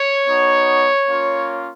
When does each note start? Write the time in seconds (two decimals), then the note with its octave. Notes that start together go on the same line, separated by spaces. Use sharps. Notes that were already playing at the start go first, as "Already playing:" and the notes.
Already playing: C#5
0.27 B3 D#4 F#4
1.06 A#3 C#4 F4